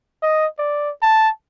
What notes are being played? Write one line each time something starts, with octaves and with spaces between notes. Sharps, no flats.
D#5
D5
A5